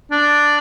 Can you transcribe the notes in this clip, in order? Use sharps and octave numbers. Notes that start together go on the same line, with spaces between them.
D4